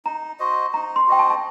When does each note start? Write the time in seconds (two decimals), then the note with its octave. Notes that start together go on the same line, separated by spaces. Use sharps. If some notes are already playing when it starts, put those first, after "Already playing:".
0.05 D#4 A#5
0.39 F#4 C5 D#5
0.73 D#4 A#5
0.96 C6
1.07 F#4 C5 D#5 G5
1.19 A5
1.30 A5